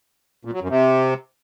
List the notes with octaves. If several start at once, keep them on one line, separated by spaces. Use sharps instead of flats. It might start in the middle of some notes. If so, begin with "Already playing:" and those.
A#2
F#3
F#2
C3